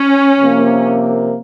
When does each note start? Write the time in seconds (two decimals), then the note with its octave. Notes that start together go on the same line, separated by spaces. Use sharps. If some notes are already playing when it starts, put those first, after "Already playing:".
Already playing: C#4
0.41 C3 F3 A#3